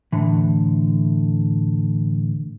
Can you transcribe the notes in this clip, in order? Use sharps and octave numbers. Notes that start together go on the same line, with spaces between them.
A2 D3 E3